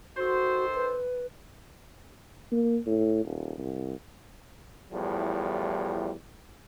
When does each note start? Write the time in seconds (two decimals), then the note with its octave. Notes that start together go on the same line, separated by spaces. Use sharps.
0.17 D#3 F#4 A4 C5
0.75 B4
2.52 A#3
2.86 A2
3.25 D#1
3.58 C2
4.92 E2 A2 F3 G3